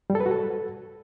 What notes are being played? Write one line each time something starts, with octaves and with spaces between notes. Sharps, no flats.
G3
A4
B4
F#4
A4